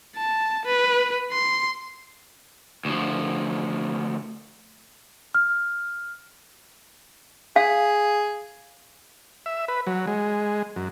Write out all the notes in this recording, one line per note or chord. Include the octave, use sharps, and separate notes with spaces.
A5
B4
C6
D2 F3
F6
G#4 F5
E5
B4
F#3
G#3
F#2